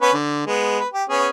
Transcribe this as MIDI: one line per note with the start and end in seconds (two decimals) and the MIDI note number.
0.02 0.13 59
0.02 0.13 61
0.02 0.13 71
0.13 0.45 50
0.47 0.79 56
0.47 0.79 59
0.80 0.88 71
0.93 1.04 67
1.10 1.29 59
1.10 1.29 61
1.10 1.29 68